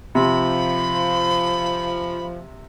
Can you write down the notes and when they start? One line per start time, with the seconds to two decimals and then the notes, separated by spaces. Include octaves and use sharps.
0.15 C3 F3 B5